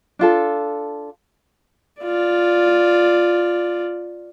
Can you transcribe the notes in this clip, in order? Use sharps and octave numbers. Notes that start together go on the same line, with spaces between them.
D4 F4 A4
F4 D5